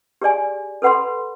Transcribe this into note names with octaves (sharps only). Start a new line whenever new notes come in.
G4 G#4 D5 G#5
A4 B4 F#5 B5 C6